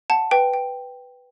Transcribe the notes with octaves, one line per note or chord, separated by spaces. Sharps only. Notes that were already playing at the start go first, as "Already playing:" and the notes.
F#5 A5
B4 G5
G5